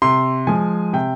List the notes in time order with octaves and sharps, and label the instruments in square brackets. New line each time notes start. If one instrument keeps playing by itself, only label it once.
[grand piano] C3 C6
F3 G#3 G#5
C3 G5